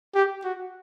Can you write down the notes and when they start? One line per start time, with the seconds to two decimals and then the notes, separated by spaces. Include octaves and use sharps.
0.15 G4
0.44 F#4